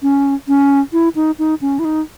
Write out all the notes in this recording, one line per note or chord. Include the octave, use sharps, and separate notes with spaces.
C#4
C#4
E4
D#4
D#4
C#4
E4
D#4